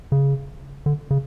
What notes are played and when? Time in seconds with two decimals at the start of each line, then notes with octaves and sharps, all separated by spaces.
0.12 C#3
0.86 D3
1.11 C#3